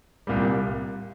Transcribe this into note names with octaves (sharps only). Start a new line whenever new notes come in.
C2 A#2 G3